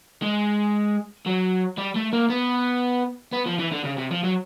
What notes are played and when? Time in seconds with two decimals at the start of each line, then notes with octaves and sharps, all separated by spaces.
0.22 G#3
1.26 F#3
1.78 G3
1.96 A3
2.13 A#3
2.30 B3
3.33 B3
3.46 F3
3.59 E3
3.72 D3
3.85 C#3
3.98 C3
4.11 F3
4.24 F#3